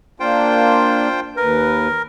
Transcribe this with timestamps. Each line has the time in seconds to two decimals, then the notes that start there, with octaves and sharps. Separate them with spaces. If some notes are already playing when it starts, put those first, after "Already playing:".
0.20 A#3 D4 F4 C5 G5
1.37 D#2 A#4 B4